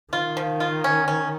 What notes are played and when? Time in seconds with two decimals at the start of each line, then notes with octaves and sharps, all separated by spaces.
0.13 D#3 F4
0.37 F3
0.60 F4
0.84 C#4
1.08 C#4